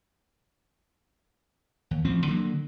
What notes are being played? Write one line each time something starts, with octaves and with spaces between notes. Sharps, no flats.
D#2
A1 F3 C4
D3 F#3 A#3